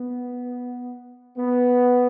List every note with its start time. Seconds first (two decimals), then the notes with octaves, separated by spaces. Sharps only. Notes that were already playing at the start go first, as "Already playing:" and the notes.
Already playing: B3
1.37 B3